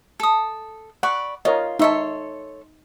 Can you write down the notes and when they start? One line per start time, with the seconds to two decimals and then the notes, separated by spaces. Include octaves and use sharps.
0.20 A4 D#6
1.03 D5 F#5 B5 C#6
1.45 F4 A#4 C#5 D#5
1.79 D#4 A4 C#5 E5 C6